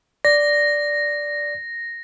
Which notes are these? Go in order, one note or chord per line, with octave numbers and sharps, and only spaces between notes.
D5 A#6